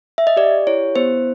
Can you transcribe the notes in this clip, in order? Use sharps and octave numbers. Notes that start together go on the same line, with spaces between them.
E5
D#5
G4 D5
E4 C#5
B3 C5